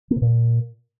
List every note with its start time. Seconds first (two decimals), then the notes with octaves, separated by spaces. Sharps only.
0.11 A#3
0.16 C3
0.22 A#2